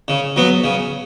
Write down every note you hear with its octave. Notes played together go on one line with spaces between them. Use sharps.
C#3
F#3 B3
C#3